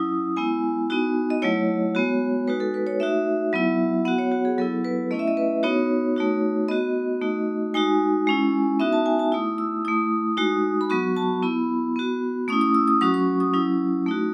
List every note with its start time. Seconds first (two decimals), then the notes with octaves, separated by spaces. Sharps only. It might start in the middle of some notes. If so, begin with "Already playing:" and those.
Already playing: F#3 C#4 E4 D#6
0.36 G#3 B3 E4 G#5
0.90 B3 D#4 F#4
1.30 D#5
1.42 F#3 A3 E4 C#5
1.95 G#3 B3 F#4
2.47 G#3 D#4 F#4 B4
2.60 A4
2.74 B4
2.87 C#5
3.00 A3 D#4 F#4 E5
3.53 F#3 B3 E4
4.05 B3 F#4 F#5
4.18 C#5
4.32 F#4
4.45 G#4
4.58 F#3 B3 E4 A4
4.85 B4
5.11 A3 C#4 E4 D#5
5.19 E5
5.28 D#5
5.37 B4
5.63 B3 D#4 F#4 C#5
6.16 A3 D#4 F#4
6.68 B3 F#4 D#5
7.21 A3 D#4 F#4
7.74 G#3 D#4 F#4 G#5
8.27 G#3 C#4 E4
8.80 B3 D#4 F#4 E5
8.93 A5
9.06 G#5
9.19 A5
9.32 A3 E4 D#6
9.58 E6
9.85 A3 E4 D#6
10.37 G#3 D#4 F#4
10.81 B5
10.90 F#3 B3 F#4 C#6
11.16 A5
11.43 B3 E4 B5
11.96 B3 F#4
12.48 A3 C#4 E4 D#6
12.61 D#6
12.75 E6
12.88 D#6
13.01 F#3 C#4 F#4 C#6
13.14 C#6
13.40 D#6
13.53 F#3 C#4 E4
14.06 A3 D#4 F#4